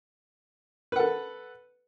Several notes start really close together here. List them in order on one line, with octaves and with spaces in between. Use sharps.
B4 F#5 A4